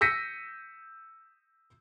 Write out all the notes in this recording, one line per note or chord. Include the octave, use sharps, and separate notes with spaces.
E6 G6 A#6 B6 C#7 D#7